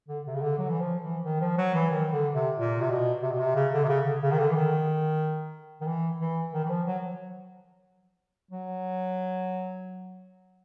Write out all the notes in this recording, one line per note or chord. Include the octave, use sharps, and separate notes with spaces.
D3
C3
C#3
D3
F#3
E3
F3
E3
D#3
F3
F#3
E3
D#3
D3
C3
A#2
C3
B2
C3
B2
C3
C#3
D3
C3
C#3
D3
C#3
D#3
D3
E3
D#3
D#3
E3
E3
D#3
E3
F3
F#3
F#3